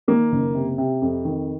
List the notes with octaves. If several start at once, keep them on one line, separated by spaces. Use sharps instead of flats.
D#3 A#3
F#1
C3
C3
F2
D#3